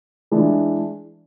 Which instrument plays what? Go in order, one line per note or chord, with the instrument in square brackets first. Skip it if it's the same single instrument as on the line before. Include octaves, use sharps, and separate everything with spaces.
[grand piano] E3 G#3 D4